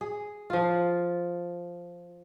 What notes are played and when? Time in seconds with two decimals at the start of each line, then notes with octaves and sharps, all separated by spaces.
0.01 G#4
0.50 F3 F4